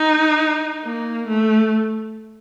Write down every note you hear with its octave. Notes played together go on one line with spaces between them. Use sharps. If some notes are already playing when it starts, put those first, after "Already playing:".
Already playing: D#4
A#3
A3